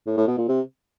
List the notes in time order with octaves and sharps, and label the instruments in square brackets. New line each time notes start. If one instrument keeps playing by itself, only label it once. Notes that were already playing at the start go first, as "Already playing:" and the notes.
[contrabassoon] A2
A2
B2
A#2
C3